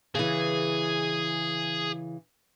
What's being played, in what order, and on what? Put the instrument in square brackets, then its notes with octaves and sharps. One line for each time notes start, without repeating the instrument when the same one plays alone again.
[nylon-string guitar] C#3 E3 [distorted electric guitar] G#4